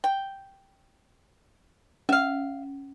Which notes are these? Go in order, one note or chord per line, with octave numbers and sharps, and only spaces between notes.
G5
C#4 E5 F5